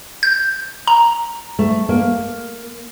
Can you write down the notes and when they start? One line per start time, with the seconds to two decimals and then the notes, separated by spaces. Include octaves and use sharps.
0.23 G6
0.87 A#5
1.59 A3
1.89 A#3